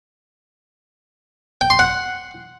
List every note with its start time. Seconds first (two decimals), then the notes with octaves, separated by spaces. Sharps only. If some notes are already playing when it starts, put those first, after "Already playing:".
1.61 G5
1.70 C6
1.79 F#5